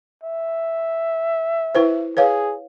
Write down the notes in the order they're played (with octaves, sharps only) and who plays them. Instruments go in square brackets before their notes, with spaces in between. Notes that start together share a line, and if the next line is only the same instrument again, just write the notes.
[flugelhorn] E5
[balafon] E4 B4 C5
[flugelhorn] G#4 [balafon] B4 C#5 F5